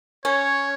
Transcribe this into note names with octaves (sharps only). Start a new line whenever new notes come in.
C#4 C#5